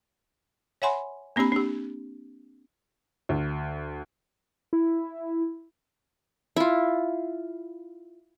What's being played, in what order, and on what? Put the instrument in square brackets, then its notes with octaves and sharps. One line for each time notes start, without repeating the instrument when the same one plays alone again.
[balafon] C#5 E5 F#5 G#5 B5 C6
A#3 C4 D4 G4 B5
D4 G4
[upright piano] D2
[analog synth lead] E4
[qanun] E4 F4